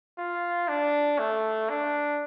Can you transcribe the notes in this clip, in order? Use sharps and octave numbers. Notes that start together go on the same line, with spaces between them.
F4
D4
A3
D4